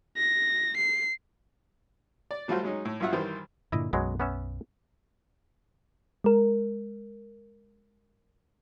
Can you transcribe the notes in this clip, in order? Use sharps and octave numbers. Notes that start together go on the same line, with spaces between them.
A#6
C7
D5
F#3 G3 A3 F4 F#4 C5
F#3 G#3 C#4 D#4
A2
B1 G2 F4 E5 F#5
D#3 E3 G3 C5
G2 A#2 D3 E4 D#5
B1 F#2 F#3 G#3 B3
B3 C#4 E5
G#3 A#4